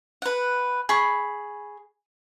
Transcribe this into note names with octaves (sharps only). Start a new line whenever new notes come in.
B4 F#5
G#4 B5 C#6